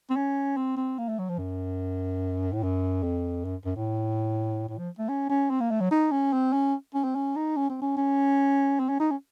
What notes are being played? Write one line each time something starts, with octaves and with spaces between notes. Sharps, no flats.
C4
C#4
C4
C4
A#3
A3
F#3
F3
F#2
A2
F#2
F2
F#2
F#2
A2
A2
F3
A3
C#4
C#4
C4
A#3
A3
F#3
D#4
C#4
C4
C#4
C#4
C4
C#4
D#4
C#4
C4
C#4
C#4
C4
C#4
D#4
C#4